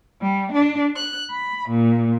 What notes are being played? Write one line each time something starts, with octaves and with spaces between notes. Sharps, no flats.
G3
D4
F#6
B5
A#2